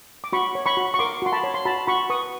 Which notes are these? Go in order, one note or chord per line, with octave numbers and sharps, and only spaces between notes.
D6
F#4 B5 C#6
C#5
B5 C#6
F#4
C#6
A#4 C6 D6
F#4 C6
A5 B5
C#5
C6
F#4 A5 B5
F#4 B5 C#6
B4 C#6 D#6